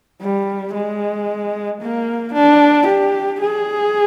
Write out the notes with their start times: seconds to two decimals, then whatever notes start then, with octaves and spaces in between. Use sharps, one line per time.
0.21 G3
0.74 G#3
1.81 A#3
2.34 D4
2.87 G4
3.41 G#4